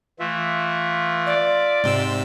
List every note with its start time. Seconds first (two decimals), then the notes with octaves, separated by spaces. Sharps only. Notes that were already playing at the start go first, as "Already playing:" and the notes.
0.19 E3 A3 F4 E5
1.26 D5
1.84 G#2 C3 C6 E6